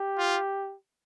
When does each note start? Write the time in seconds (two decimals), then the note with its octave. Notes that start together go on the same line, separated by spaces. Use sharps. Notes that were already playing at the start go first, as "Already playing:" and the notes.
Already playing: G4
0.18 F4